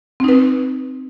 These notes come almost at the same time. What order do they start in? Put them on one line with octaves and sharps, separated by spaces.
C4 D#4 B4